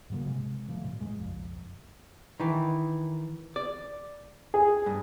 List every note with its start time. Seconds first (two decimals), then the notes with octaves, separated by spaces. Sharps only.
0.10 G#2 C#3 F#3 A#3
0.25 C3 G#3
0.68 B2 F3 F#3 A3
0.84 A1 B2
1.00 A1 F2 G#3
1.19 F#1 B1 F2
2.40 D#3 E3
3.56 D5
4.54 G#4
4.86 G2